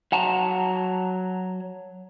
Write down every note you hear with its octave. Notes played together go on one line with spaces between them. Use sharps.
F#3 F#5 A5 A#5